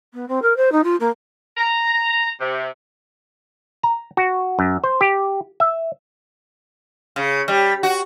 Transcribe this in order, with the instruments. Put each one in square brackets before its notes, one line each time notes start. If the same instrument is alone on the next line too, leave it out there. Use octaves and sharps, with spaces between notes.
[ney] B3
C4
A#4
C5
D#4
F4
A#3
[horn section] A#5
C3
[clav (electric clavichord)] A#5
F#4
F#2
C5
G4
E5
[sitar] C#3
G3
F#4